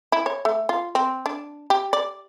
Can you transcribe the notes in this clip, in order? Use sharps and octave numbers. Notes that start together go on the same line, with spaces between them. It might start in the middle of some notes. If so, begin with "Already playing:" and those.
E4
C#5
A3
F4
C4
D4
G4
D5